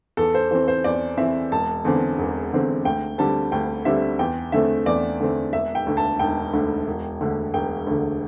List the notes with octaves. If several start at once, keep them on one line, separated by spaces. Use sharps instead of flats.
E2 A4
C5
E3 C4 C5
C5
E2 D5
E3 C4 E5
E1 A5
E2 D3 C4
E1
E2 D3 C4
D2 G5
D3 G3 C4 A5
D2 G5
D3 G3 C4 E5
E2 G5
D3 A3 C4 E5
E2 D5
D3 A3 C4
E1 E5
G5
D2 D3
A5
E1 G5
D2 D3
E1
D2 D3
E1 G5
D2 D3